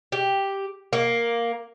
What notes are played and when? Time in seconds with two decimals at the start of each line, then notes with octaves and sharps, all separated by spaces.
0.12 G4
0.93 A#3